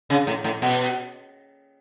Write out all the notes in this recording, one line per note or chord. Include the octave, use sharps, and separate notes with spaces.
C#3
A2
A2
B2